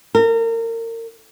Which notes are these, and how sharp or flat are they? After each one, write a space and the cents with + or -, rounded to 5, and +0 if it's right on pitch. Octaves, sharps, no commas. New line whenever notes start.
A#4 -30